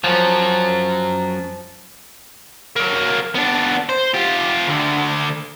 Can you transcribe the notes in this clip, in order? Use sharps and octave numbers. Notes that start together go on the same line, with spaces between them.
F#2 F3 F#3
F#3 A#3
B3 D4
C5
F4 G4
D2 D3